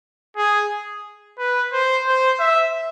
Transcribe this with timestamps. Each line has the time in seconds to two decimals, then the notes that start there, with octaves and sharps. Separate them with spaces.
0.37 G#4
1.38 B4
1.73 C5
2.07 C5
2.39 E5